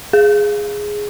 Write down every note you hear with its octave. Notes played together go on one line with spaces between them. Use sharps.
G#4